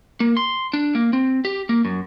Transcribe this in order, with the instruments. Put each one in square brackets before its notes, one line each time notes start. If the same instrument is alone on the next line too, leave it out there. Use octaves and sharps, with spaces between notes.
[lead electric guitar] A#3
C6
D4
A#3
C4
G4
A#3
F#2